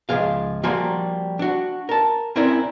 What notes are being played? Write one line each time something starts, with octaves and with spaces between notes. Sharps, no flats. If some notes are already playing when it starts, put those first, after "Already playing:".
C#2 G#2 F3 G#4 F5
F3 G3 A#3 F#4 G#5 C6
D4 F#4
A#4 A5
C4 C#4 E4 A#4 D5 E5